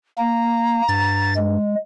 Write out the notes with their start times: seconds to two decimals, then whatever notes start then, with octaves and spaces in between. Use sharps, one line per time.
0.18 A#3 A#5
0.88 G2 A6
1.37 G#3